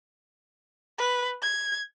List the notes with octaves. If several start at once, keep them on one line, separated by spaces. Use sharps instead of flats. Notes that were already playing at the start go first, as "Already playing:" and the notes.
B4
G#6